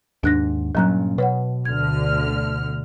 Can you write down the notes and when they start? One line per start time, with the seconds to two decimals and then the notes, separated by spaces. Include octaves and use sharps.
0.23 D#2 G#2 D4 F#6 A#6
0.75 G2 A#2 F#3 C#4 A#5 F#6
1.18 B2 B4 C#5 F#5
1.65 D2 D3 F6 G#6
2.29 A3